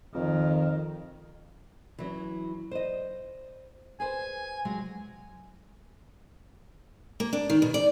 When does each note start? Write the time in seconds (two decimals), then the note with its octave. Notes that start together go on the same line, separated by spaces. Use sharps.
0.15 F2 D#3
1.99 E3 F#3 C#4
2.71 C5 D#5
4.00 G#4 B4 C5 G#5
4.65 C3 F#3 G#3
7.20 A#3
7.33 D4
7.50 D#3
7.62 B2
7.74 D5